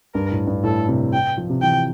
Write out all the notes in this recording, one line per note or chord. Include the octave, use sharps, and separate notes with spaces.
G2 A#4
A2
G2
A2 A4
C3
G5
F3
C3
E3 G5